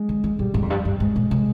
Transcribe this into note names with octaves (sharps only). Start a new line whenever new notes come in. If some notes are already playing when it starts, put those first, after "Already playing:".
Already playing: G#3
D3
D3
A#2 G3
G#2
F2
G2
G2
G#2 G#3
A#2
C3